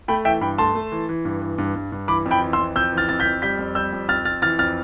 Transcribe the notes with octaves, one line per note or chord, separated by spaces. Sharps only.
A3 G5 B5
E3 E5 G5
G2 G5 B5
A3 A5 C6
A3
E3
E3
G2
E3
G2
G2
G2
E3 B5 D6
F2
G5 B5
E3
C6 E6
F2
F2 E6 G6
E3
F6 A6
F2 A6
G6 B6
F2
G3 G6 B6
F2
G3 E6 G6
F2
F2 F6 A6
F2 F6 A6
E3 F6 A6
F2 F6 A6